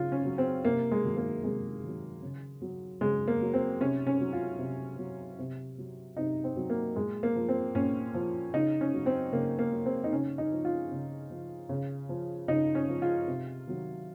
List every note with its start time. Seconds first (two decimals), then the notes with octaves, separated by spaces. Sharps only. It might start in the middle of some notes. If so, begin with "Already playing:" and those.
Already playing: C#3 F#3 F4
0.12 C#4
0.25 F#3
0.38 C4
0.64 C3 A#3
0.92 G#3
1.05 D#3 F#3
1.17 A#3
1.44 C3 G#3
1.83 D#3 F#3
2.23 C#3
2.62 F#3
3.01 C#3 G#3
3.28 A#3
3.41 F#3
3.54 C4
3.80 C3 C#4
4.07 C#4
4.20 F#3
4.33 F4
4.59 C3
4.98 F#3
5.39 C3
5.78 F#3
6.17 C3 D#4
6.44 C4
6.56 F#3
6.70 A#3
6.96 A#2 G#3
7.23 A#3
7.35 F3
7.49 C4
7.75 A#2 C#4
8.14 F3
8.53 C#3 D#4
8.81 C#4
8.94 F#3
9.06 C4
9.32 C#3 A#3
9.59 A#3
9.72 F#3
9.86 C4
10.04 D#4
10.12 C#3 C#4
10.38 D#4
10.52 F3
10.65 F4
10.91 C#3
11.30 F3
11.69 C#3
12.09 F3
12.48 C#3 D#4
12.75 C#4
12.89 F3
13.02 F4
13.27 C3
13.67 D#3 F#3